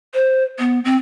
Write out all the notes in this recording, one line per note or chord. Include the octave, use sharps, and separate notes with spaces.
C5
B3
C4